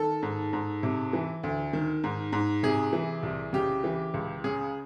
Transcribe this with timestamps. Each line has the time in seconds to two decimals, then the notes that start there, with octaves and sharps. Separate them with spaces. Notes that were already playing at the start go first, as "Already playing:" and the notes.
Already playing: D#3 A4
0.23 G#2
0.53 G#2
0.83 C3
1.13 E3
1.43 D2
1.73 D#3
2.04 G#2
2.33 G#2
2.63 C3 G#4
2.93 E3
3.23 C2
3.53 C#3 G4
3.84 E3
4.14 C#2
4.44 C#3 G#4